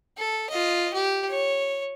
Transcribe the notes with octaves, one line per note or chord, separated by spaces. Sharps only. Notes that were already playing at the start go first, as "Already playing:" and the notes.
A4
F4 D#5
G4
C#5